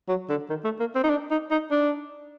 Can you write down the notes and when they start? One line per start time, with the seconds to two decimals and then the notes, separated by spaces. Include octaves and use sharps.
0.08 F#3
0.29 D3
0.49 D#3
0.64 A3
0.80 A#3
0.95 C4
1.03 D#4
1.10 D4
1.31 D#4
1.51 D#4
1.71 D4